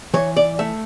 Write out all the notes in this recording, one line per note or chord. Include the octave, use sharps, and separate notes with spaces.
E3 C#5
D5
A3 E5